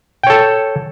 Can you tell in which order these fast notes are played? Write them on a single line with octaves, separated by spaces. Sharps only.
G5 C#5 A4